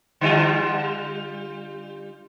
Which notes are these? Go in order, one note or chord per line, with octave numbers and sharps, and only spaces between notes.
D3 G3 F4